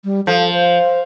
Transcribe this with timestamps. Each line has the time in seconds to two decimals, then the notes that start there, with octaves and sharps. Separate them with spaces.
0.05 G3
0.27 F3 A4
0.53 C5